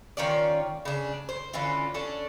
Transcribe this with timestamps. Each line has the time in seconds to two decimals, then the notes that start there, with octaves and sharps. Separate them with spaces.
0.17 D#3 C#4 F4 D5
0.85 C#3 D4
1.29 C5
1.53 D3 E3 C#4 F4
1.94 C#4 D4 A4